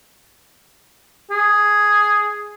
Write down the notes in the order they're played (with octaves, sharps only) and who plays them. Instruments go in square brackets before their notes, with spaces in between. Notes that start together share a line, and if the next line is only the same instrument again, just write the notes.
[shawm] G#4